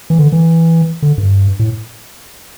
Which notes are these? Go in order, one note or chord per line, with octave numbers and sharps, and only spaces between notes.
E3
D3
E3
D3
G2
A2